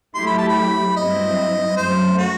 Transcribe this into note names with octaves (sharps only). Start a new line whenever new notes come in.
F#3 A3 E4 G4 C6
B5
A5
B5
G2 F#3 C4 E4 D#5
F#2 F#3 A3 C5
F#4